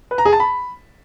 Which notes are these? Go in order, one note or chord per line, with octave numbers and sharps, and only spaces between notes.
B4
A#5
G#4
A5
B5